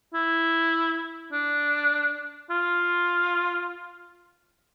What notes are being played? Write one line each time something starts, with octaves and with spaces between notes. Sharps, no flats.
E4
D4
F4